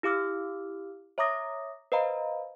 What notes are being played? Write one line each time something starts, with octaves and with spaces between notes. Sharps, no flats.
E4 G4 F5 D6 E6 F6
C#5 E5 A#5 D6 D#6 A#6
B4 C5 D#5 F5 A#5 B5